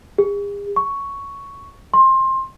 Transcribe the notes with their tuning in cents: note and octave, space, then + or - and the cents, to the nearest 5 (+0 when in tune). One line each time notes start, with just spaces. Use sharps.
G#4 -45
C#6 +5
C6 +20